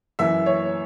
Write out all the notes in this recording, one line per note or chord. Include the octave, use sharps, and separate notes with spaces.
F#2 E3 E5
C#5